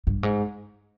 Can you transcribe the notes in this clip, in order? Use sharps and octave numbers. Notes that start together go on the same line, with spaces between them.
G2
G#2